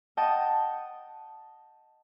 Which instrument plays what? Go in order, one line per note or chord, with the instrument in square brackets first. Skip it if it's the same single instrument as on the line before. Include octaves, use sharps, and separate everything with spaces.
[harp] D#5 F#5 G5 A5 D#6